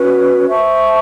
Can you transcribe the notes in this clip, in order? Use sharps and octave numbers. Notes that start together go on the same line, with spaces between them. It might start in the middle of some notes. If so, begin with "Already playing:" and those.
Already playing: C#4 F#4 B4
C5 E5 A5 C#6